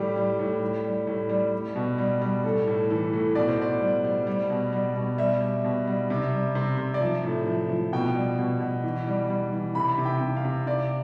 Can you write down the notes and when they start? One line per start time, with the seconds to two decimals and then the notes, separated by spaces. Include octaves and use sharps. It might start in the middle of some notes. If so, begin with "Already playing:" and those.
Already playing: A2 G3 G4
0.16 G3
0.39 A2
0.62 G3
0.84 G3
1.07 A2
1.29 G3
1.53 G3
1.76 B2
1.98 G3
2.22 G3
2.44 A2 A4
2.67 A2
2.90 E3 A4
3.13 A2
3.35 B2 D5
3.48 C5
3.58 B2 D5
3.81 G3
4.04 G3
4.27 G3
4.50 B2
4.73 G3
4.95 B2
5.18 G3 E5
5.41 G3
5.64 B2
5.87 G3
6.10 C3
6.33 G3
6.55 C3
6.78 C3
6.94 D5
7.01 F3 E5
7.24 A2
7.46 F3
7.70 F3
7.93 B2 G5
8.15 G3
8.39 B2
8.60 B2
8.84 E3
9.07 G3
9.30 G3
9.52 E3
9.75 C3 B5
9.98 C3
10.05 G5
10.21 C3
10.37 F5
10.44 C3
10.67 C3 D5